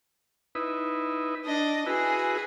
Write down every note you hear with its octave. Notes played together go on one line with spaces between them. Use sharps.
D#4 E4 B4
D4 D#5
E4 F#4 G#4 B4